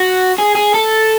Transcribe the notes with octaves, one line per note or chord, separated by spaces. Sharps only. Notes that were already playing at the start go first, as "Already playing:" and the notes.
Already playing: F#4
G#4
G#4
A4